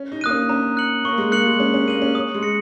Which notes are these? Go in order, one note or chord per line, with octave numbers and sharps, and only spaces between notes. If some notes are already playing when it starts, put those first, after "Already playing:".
Already playing: C#4
D#4
A#3 D#6 F#6 D#7
C#4
C#4 A#5
F#6 C#7 F#7
A#3 C#6
G#3
A#3 F#6 C#7 F#7
G#3
C#4 F#6
C#4
A#3 D#7 F#7
C#4
D#6
G#3
A#6 C#7